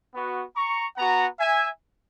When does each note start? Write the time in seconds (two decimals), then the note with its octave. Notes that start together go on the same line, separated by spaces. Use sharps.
0.14 B3 F#4
0.56 A#5 C#6
0.97 B3 F#4 F#5 A#5
1.39 E5 G#5